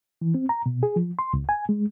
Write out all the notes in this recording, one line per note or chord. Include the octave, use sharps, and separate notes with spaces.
E3
C4
A#5
B2
G#4
F3
C6
C#2
G#5
G#3